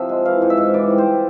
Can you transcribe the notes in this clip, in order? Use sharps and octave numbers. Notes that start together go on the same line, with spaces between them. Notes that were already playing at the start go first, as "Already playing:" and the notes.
Already playing: C3 F3 E5
G#3
E3 F5
G#2
E5
G#2
E3 D5
G3
C5